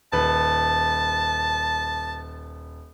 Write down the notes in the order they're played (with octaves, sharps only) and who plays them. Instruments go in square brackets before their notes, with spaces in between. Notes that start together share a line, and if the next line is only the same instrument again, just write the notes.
[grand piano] D#1 B4 [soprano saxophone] A5